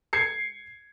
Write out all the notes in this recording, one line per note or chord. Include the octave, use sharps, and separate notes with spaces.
G#6 C7 C#7